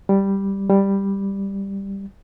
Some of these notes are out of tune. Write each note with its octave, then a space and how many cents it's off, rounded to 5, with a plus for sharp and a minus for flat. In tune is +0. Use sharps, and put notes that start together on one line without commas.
G3 +0
G3 +5